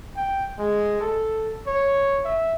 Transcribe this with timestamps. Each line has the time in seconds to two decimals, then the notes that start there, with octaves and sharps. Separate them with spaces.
0.17 G5
0.59 G#3
1.01 A4
1.67 C#5
2.25 E5